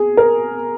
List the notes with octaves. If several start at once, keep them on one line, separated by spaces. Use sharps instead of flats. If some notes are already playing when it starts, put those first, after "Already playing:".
Already playing: G#4
A#4